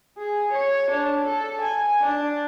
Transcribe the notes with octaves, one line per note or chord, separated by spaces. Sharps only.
G#4
C#5
D4
A4
G#5
D4